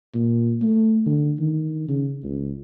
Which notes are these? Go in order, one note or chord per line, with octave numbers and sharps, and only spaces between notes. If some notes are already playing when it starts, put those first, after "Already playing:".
A#2
A3
D3
D#3
C#3
C#2